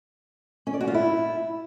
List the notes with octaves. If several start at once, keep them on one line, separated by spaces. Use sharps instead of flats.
C#4
D5
F#4
F4
E4